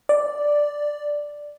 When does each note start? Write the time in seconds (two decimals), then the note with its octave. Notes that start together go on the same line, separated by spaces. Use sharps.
0.09 D5